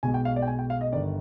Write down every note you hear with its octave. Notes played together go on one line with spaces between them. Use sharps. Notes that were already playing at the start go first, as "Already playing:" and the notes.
B1 B2 G#3 G#5
G5
F5
D5
G5
G#5
G5
F5
D#5
G1 G2 D#3 D5